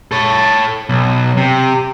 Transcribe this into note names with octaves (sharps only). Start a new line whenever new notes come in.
A4 C#5
B1
C3